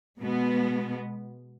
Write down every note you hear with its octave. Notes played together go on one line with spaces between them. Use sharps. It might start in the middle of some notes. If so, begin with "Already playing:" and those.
B2 G#3 B3